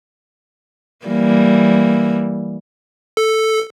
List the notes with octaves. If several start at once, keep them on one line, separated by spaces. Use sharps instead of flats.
E3 G3 A#3
A4